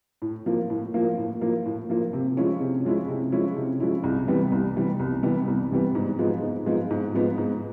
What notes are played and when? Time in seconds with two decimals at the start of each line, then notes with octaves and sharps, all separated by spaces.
0.22 A2
0.46 F3 A#3
0.70 A2
0.94 F3 A#3
1.18 A2
1.42 F3 A#3
1.66 A2
1.90 F3 A#3
2.13 C3
2.37 F3 G#3 C#4 E4
2.61 C3
2.85 F3 G#3 C#4 E4
3.09 C3
3.32 F3 G#3 C#4 E4
3.56 C3
3.80 F3 G#3 C#4 E4
4.04 C2
4.28 C3 E3 G3 B3
4.52 C2
4.76 C3 E3 G3 B3
4.99 C2
5.23 C3 E3 G3 B3
5.48 C2
5.71 C3 E3 G3 B3
5.95 G#2
6.19 F3 G#3 B3 D#4
6.42 G#2
6.66 F3 G#3 B3 D#4
6.91 G#2
7.14 F3 G#3 B3 D#4
7.38 G#2